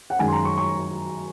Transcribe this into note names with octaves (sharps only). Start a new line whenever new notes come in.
F#5
F#2 D#3 G#3 G#5
C6
A#5
C#6
C#6